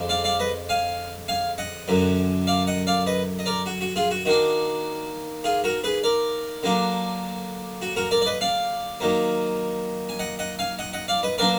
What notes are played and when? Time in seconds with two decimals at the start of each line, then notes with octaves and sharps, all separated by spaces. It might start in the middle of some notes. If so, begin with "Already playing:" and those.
Already playing: F2 D3 F3 G#3 D4
0.09 D5 F5
0.24 D5 F5
0.39 B4 D#5
0.69 F5 G#5
1.28 F5 G#5
1.58 D#5 F#5
1.88 F#2 D3 F#3
2.47 D5 F5
2.67 D#5 F#5
2.87 D5 F5
3.06 B4 D#5
3.39 D#5
3.46 A#4 D5
3.66 F#4
3.81 F#4
3.96 F4 G#4
4.11 F#4
4.25 D#3 A#3 D4 F#4
5.44 F4 G#4
5.64 F#4 A#4
5.84 G#4 B4
6.03 A#4 D5
6.63 D3 F#3 A#3 D4
7.82 F#4
7.96 F#4 A#4
8.11 A#4 D5
8.22 D5
8.26 B4 D#5
8.41 D5 F5
9.00 D#3 F#3 A#3
10.09 G#5
10.19 D#5 F#5
10.39 D#5 F#5
10.59 F5 G#5
10.79 D#5 F#5
10.93 D#5 F#5
11.08 D5 F5
11.23 B4 D#5
11.38 B2 F#3 A#3 D4 A#4 D5